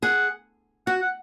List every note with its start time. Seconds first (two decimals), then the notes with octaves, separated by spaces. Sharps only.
0.03 G#4 F#5
0.87 F#4 F#5
1.01 F#5